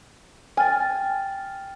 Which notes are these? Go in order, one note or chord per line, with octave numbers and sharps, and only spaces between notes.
G5 G#5 F6 A6